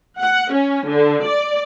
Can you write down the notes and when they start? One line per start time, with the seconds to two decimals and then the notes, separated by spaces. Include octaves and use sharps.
0.19 F#5
0.51 C#4
0.86 D3
1.26 D5